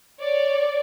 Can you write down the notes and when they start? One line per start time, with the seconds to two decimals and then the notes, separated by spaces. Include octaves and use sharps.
0.20 C#5 D5